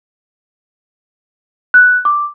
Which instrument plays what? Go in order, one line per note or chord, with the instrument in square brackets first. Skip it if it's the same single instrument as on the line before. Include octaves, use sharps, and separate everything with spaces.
[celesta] F#6
D6